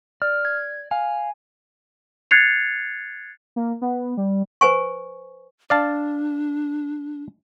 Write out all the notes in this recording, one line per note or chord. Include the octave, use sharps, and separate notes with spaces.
D5 F6
G#6
F5 G#5
F#6 G#6 A6 C7 C#7 F7
A#3
B3
G3
B4 C5 G#5 C#6
D4 D5 F5 A5